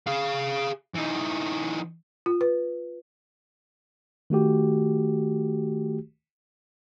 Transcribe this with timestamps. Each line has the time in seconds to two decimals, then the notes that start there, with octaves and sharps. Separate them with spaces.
0.07 G#4 F5
0.95 E3 D#4
2.26 F4
2.41 B4
4.30 D#3 A3 F#4 G4